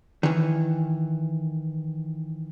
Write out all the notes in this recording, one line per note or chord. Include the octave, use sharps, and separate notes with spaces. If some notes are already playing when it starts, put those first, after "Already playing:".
D#3 E3